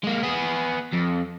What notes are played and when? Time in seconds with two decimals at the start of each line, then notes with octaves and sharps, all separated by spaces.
0.04 G#3 A#3
0.23 B3 G#4
0.93 F2